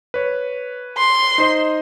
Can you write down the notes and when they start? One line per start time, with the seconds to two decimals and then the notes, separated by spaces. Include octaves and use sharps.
0.14 B4 C#5
0.98 C6
1.38 D#4 C5 D#5